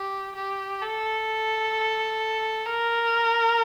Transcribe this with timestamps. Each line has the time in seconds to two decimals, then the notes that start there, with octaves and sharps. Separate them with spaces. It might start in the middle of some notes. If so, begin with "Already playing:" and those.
Already playing: G4
0.35 G4
0.81 A4
2.66 A#4